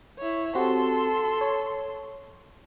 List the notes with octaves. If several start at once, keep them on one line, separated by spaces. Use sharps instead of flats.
E4 C#5
C4 F#4 G4 A4 C6
C#5